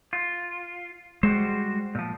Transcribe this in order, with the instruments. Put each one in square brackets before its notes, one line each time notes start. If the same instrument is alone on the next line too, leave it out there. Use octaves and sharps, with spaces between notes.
[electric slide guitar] F4
[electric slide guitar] G3 F#4 C5 [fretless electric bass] G#3
[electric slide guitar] A#2 F3